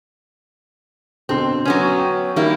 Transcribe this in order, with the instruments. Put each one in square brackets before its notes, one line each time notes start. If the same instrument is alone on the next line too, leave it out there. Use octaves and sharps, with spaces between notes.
[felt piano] B2 D3 C6 [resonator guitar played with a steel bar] C4
[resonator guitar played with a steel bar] F#3 B3 C#4
[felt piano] G5
[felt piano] D#3 [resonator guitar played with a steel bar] G3 A#3 E4